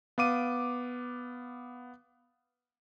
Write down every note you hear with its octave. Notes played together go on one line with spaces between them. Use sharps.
B3 F5 D6 D#7